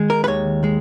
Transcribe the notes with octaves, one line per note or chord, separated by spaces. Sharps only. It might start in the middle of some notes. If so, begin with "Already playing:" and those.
Already playing: D#3 G#3
A#4
B4
D#2 C#5
G#3